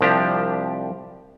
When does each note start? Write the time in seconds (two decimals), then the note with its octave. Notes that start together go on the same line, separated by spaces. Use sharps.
0.01 C2 F3 D4 G4